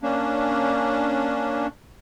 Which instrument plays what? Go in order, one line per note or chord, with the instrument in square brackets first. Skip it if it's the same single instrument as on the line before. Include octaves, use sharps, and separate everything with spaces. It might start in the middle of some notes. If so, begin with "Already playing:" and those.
[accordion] A#3 C#4 D4